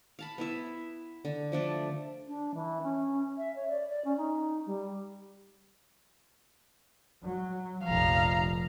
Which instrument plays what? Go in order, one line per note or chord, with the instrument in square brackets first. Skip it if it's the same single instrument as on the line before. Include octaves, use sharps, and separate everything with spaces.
[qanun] F5 A5 B5
B3 E4 E5
D3
F3 A3 D4 D5
[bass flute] D4
E3
C#4
E5
C#5
D5
D5
C#4
D#4
G3
[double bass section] F#3
[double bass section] F1 A#1 F3 [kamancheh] F5 A#5